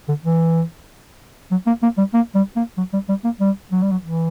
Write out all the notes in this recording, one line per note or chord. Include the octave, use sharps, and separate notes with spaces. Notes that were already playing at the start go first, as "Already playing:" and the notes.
D3
E3
F#3
A#3
A#3
G3
A#3
G3
A#3
F#3
G3
G3
A#3
G3
F#3
G3
F#3
E3